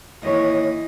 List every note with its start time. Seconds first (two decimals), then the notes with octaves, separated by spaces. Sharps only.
0.23 D#2 E3 C#5 D#5